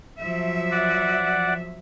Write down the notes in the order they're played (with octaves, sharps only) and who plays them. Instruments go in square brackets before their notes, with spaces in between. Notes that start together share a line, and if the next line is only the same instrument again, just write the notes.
[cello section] F3 F#3 E5
[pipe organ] D5 F#5